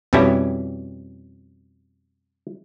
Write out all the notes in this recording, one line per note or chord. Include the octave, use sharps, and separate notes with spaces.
F2 B2 G3 C#4 E4